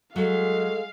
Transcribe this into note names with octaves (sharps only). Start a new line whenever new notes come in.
F#3 G#3 A4 F5